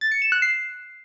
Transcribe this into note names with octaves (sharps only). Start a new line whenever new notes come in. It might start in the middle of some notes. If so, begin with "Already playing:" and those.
A6
C#7
E7
F#6
C7